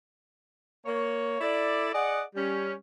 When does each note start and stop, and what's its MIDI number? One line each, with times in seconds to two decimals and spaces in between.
0.86 1.36 58
0.86 1.36 73
1.41 1.91 64
1.41 1.91 69
1.41 1.91 74
1.93 2.22 68
1.93 2.22 74
1.93 2.22 75
1.93 2.22 78
2.36 2.73 55
2.36 2.73 61